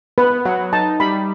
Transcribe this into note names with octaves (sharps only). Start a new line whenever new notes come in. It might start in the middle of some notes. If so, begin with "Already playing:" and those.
B3 B4
F#3 F#5
D#4 A5
G3 B5